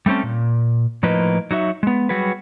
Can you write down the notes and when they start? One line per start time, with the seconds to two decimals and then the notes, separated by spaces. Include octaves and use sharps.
0.06 G3 A3 C4 C#4 A4
0.23 A#2
1.03 A2 F3 A#3 D#4 B4 D#5
1.51 F#3 D#4 F#4 E5
1.83 G#3 B3
2.09 F#3 G3 F#4 G#4 B4